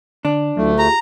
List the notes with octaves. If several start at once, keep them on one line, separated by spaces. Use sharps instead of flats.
D3 D4
D2 F#3 A3 E4 F4
F4 G4 G#4 A#5